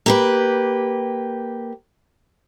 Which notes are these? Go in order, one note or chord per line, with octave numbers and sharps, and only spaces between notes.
A#3 G4 B4